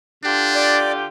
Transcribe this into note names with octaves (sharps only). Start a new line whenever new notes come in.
D3 D4 F4 G4
D5